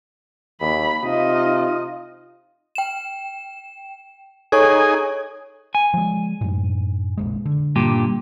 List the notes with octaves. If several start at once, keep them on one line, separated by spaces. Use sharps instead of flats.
D#2 B5
C3 D#4 F4 D#5
G5 E7
D#4 G#4 A4 C#5 G#5 C#6
G#5
F3 G#3
F#2 A2
F1 A#1 G#3
D3
G2 A#2 G4